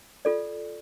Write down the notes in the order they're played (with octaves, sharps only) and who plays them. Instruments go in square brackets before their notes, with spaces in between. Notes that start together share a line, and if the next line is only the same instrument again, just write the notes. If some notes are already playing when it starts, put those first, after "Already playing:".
[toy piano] F4 A4 D5